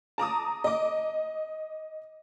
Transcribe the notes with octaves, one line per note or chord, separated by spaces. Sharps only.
A5 A#5 D6 D#6
D#5 D6